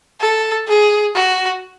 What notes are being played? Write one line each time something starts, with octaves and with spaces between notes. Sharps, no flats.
A4
G#4
F#4